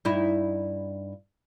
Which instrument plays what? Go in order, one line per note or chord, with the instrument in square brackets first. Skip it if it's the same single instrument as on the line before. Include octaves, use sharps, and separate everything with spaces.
[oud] G2 D#4 E4